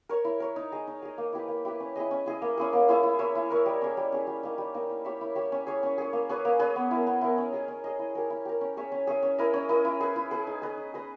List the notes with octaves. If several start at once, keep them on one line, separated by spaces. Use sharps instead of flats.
A#4 C#5
E4
A#4 C#5
D#4
G#4 D#5
D#4
G#4 D#5
A#3
E4 G4 B4
A#3
E4 G4 B4
C#4
E4 G#4 D#5
C#4
E4 G#4 D#5
A#3
C#4 E4 G#4
A#3
C#4 E4 G#4
E4
A#4 C#5 E5
E4
A#4 C#5 E5
G3
C#4 G#4
G3
C#4 G#4
G3
A#3 D#4
G3
A#3 D#4
E4
G4 C#5 E5
E4
G4 C#5 E5
C#4
G#4 C#5
C#4
G#4 C#5
A#3
C#4 G#4 B4
A#3
C#4 G#4 B4
B3
E4 A#4
B3
E4 A#4
C#4
G#4 D#5
C#4
G#4 D#5
E4
G4 A#4
E4
G4 A#4
C#4
G#4 C#5 E5
C#4
G#4 C#5 E5
C#4
E4 A#4 D#5
C#4
E4 A#4 D#5
E4
G#4 B4
E4
G#4 B4
D#4
G#4 B4 D#5
D#4
G#4 B4 D#5